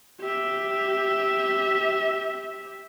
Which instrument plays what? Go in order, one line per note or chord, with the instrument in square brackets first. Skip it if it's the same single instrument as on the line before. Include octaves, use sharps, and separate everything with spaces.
[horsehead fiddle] G4 E5